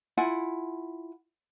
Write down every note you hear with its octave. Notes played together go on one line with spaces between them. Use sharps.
E4 F4 F#5 G#5